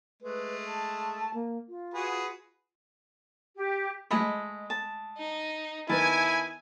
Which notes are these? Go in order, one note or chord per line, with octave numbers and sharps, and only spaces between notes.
G#3 A3 B4
A5
A#3
F4
F#4 G#4 B4
G4
G#3 A3 D#5 B5
A5
D#4
D#3 B3 E4 E5 G#5 A5